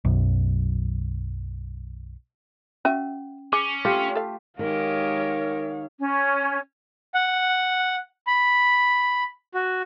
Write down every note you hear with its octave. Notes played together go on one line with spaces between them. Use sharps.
B1 F#2
C#4 F#4 E5
C#4 G#4 D6
A3 C4 F4 G4
A4 F5
D#3 G#3 G4 A#4 C#5 F5
C#4
F#5
B5
F#4